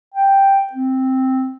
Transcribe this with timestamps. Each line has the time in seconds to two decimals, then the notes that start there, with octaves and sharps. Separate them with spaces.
0.14 G5
0.73 C4